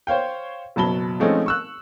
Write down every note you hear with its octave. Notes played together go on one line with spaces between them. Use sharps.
C5 C#5 F5 G5
F#1 B2 F#3 A5 B5 G7
F3 G#3 A3 C4 C#4 D#4
C#6 E6 F#6